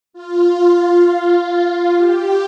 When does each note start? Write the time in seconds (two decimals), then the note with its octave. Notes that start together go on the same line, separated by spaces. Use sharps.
0.13 F4
1.95 G4